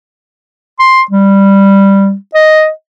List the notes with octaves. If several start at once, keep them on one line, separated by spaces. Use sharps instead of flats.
C6
G3
D#5